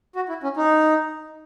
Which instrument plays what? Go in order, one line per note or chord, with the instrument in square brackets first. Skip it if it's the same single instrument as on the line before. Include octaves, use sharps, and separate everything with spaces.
[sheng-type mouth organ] F#4
E4
C#4
D#4